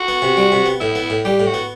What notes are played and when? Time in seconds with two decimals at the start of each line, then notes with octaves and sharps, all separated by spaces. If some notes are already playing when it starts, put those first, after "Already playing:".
Already playing: F#4
0.08 B3
0.22 C3
0.37 G3
0.52 C3
0.66 B3
0.80 A2 E4
0.95 B3
1.10 A2
1.25 G3 G4
1.40 A2
1.47 F#4
1.54 B3